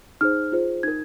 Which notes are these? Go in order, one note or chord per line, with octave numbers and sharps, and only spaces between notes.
D#4 G#4 C5 F6
F4 G#4 C5
D#4 A#4 G#6